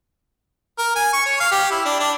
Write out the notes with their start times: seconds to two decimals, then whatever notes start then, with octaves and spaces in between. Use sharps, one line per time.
0.79 A#4
0.96 G#5
1.13 C#6
1.26 C#5
1.40 F5
1.52 G4
1.71 E4
1.85 D4
2.00 D4